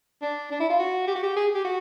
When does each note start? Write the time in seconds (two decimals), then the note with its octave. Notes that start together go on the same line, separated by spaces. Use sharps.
0.22 D4
0.51 D4
0.60 E4
0.69 F4
0.79 F#4
1.07 G4
1.16 F#4
1.23 G4
1.36 G#4
1.55 G4
1.65 F#4